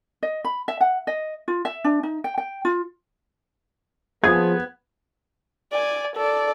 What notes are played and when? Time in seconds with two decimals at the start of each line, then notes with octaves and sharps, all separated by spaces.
0.23 D#5
0.45 B5
0.68 E5
0.81 F#5
1.07 D#5
1.48 F4
1.65 E5
1.84 D4
2.03 D#4
2.24 G5
2.38 G5
2.65 F4
4.24 F3 B3 G#4 G#6
5.72 D5 G#5
6.16 A4 D5